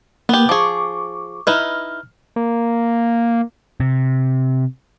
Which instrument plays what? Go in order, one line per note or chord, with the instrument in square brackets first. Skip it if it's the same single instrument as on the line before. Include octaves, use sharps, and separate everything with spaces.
[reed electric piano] A#3 [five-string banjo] B3 G4
[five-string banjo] F3 G#4 [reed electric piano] C#6 D6
[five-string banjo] D#4 E4 B4 [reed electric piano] F6
[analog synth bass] A#3
[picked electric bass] C3